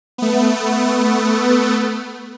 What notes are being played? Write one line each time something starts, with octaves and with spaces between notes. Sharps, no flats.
A3 B3